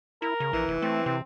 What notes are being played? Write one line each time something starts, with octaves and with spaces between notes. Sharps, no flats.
E4 A#4
C#3
A#1 E3
F1
A3 C4
C3 C4